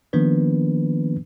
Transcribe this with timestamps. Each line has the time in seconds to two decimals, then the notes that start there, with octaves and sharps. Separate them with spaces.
0.13 D#3 F3 A#3 B3 D4 B4